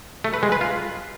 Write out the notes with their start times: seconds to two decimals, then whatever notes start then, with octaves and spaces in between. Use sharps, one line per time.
0.24 A3
0.34 B4
0.43 G#3
0.52 B4
0.61 F4